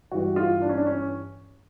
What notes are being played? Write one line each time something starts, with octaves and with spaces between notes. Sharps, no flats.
G2 E3 G3 F#4
F4
D4
C#4
D4
C#4